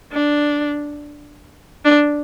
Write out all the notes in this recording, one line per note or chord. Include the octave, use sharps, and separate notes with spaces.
D4
D4